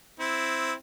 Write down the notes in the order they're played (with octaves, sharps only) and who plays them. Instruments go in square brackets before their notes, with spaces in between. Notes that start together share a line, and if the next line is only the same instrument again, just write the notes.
[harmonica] C4 E4